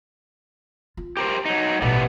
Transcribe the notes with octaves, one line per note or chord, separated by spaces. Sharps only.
F4
G4 A#4 C5
F#3 D#4
A1 B2 G3 A3 B3